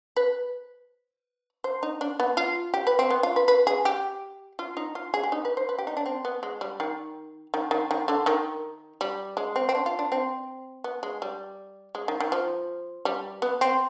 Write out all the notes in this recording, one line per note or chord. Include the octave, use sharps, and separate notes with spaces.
B4
C5
D#4
D4
B3
F4
G4
B4
C4
B3
F4
B4
B4
G#4
G4
F4
D#4
F4
G#4
G4
D#4
B4
C5
B4
G4
D#4
D4
C4
B3
G#3
G3
D#3
D#3
D#3
D#3
D3
D#3
G3
G#3
C4
C4
D4
F4
D4
C4
B3
G#3
G3
G#3
D#3
D#3
F3
G3
B3
C4